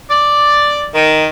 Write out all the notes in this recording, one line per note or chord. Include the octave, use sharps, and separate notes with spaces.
D5
D#3